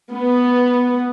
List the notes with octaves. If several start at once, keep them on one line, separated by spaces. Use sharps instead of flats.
B3